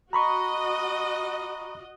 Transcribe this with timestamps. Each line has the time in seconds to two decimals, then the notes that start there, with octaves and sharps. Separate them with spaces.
0.13 F#4 D#5 A#5 B5 C#6